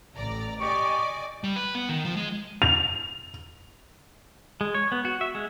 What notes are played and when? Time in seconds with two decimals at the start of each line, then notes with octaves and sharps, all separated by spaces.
0.16 A1 D5 A#5
0.60 G4 D5 D#5 G#5 C#6
1.44 G3
1.56 B4
1.75 B3
1.89 D#3
2.05 F3
2.17 G#3
2.62 F7
4.61 G#3
4.74 C#5
4.92 B3
5.05 F#4
5.21 E5
5.35 G#3